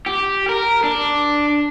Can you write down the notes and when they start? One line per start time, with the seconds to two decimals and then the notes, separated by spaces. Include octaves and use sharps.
0.06 G4
0.49 A#4
0.84 D4